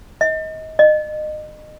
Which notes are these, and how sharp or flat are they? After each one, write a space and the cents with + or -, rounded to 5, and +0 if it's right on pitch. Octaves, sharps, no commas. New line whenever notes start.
D#5 +25
D#5 -30